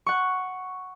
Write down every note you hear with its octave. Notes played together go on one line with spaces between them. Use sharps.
F#5 C#6